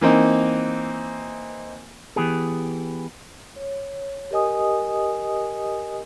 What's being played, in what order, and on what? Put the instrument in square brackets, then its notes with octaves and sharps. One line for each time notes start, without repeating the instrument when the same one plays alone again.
[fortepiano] E3 A#3 C4 D#4
[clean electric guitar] E3 B3 G4 G#4
[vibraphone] C#5
G4 A#4 D#5 G#5 D#6